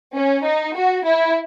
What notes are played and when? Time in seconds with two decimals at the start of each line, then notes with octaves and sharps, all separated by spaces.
0.15 C#4
0.46 D#4
0.76 F#4
1.06 E4